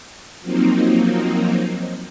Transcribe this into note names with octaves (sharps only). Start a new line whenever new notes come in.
F3 F#3 A#3 C4 D#4